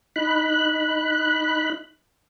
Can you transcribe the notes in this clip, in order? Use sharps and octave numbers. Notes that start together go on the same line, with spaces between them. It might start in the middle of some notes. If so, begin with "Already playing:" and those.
D#4 B5 F#6